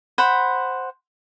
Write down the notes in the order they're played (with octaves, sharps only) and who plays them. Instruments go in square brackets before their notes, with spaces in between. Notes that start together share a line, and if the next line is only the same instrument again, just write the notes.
[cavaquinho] C5 F#5 B5